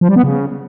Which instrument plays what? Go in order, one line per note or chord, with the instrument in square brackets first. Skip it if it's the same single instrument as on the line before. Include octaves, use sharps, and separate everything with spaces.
[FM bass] F3
G3
B3
C#3